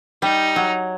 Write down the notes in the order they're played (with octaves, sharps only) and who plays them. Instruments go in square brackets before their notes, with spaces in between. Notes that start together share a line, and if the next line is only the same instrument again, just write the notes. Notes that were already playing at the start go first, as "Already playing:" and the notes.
[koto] G3 [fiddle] D#4
[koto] F#3